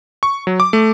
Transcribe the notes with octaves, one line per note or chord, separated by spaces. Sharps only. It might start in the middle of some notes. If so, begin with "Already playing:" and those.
C#6
F#3
D6
A3